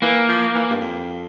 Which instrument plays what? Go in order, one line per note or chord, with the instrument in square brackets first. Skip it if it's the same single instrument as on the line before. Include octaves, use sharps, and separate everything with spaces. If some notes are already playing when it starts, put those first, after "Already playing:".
[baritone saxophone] E3 [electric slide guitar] A#3
[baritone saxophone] F3
E3
G2
F2